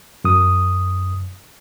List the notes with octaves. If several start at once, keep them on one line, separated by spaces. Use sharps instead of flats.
F#2 D#6